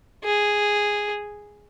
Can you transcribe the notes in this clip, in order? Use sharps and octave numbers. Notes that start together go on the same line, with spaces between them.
G#4